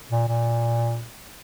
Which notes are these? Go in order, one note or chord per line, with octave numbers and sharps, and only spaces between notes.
A#2
A#2